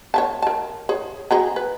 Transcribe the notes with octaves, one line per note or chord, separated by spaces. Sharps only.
C#5 E5 A5
A#4 A5
G#4 C#5
F#4 G#4 A#5
B4